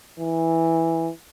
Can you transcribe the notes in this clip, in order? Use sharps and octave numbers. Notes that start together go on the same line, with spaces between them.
E3